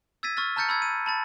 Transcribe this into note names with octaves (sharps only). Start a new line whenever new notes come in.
E6 G#6 A6 B6 D#7
C#6 E6 F6 A6
A5 A#5 F6 G6 A6 C#7
B5 E6 G#6
D#7
A5 B5 A6